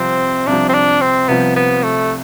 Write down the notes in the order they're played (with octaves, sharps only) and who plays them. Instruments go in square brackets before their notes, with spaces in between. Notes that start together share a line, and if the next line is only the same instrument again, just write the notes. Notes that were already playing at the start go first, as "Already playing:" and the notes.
Already playing: [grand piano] C2 C3 F3 [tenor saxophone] C4
[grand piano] C2 C3 F3 [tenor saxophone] D4
[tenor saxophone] C4
D4
C4
[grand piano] C2 C3 F3 [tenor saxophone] B3
[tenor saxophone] B3
A3